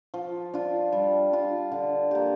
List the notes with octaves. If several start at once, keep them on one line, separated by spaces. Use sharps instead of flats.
F3
D4 F4
G3
D4 F4
D3
A#3 G4